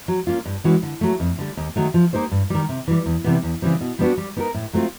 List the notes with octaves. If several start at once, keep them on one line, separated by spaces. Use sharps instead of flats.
F#3
A#3 C#4 F4
G2
E3 G#3 C#4 F#4
D3
F#3 A3
F2
D3 G3
D#2
D#3 F#3 A3
F3
A#3 D#4 G4 C5
G2
D#3 G3
C3
E3 G3
E2
C3 E3 G3 B3
E2
C#3 E3 G3 C4
B2
G3 B3 D4 F#4
G3
B3 D#4 F#4 A#4
A2
F#3 A3 C4 F4